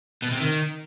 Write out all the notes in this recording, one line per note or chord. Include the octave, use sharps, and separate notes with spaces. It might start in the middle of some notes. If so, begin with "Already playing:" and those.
B2
C3
D#3